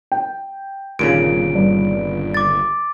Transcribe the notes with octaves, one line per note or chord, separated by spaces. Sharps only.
G5
G1 D#2 A#2 C#3 D7
G2
D6 A6